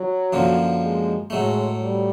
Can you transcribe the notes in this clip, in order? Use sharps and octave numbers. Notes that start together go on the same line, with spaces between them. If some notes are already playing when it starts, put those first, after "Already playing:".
Already playing: F#3
F#2 D3 F3 A#3
G#3
A2 F#3 G#3 A3
G3